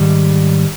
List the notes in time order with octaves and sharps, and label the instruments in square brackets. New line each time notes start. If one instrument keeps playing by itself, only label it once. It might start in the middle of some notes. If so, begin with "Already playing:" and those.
Already playing: [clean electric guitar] G#2 D#3 G3